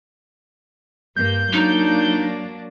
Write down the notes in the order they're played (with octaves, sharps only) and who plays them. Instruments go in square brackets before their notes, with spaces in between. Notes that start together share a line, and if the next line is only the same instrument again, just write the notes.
[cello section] G2 A#3 [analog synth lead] G6
[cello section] F#3 A#3 D4 [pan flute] D#4